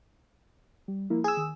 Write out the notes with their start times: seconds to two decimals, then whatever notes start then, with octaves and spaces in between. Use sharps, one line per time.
0.88 G3
1.10 F3 A#3 E4
1.24 G#4 E6 G#6
1.37 D#3